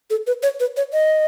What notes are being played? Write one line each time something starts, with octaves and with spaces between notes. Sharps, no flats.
A4
B4
C#5
B4
C#5
D#5